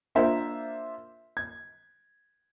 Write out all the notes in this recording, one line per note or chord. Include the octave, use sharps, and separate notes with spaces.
A#3 D4 F4 C5 E5
G#6